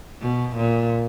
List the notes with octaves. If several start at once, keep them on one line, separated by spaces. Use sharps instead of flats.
B2
A#2